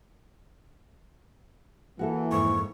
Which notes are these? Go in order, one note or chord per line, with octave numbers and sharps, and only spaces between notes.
E3 A#3 F#4 G4 A4
F2 G#2 C#6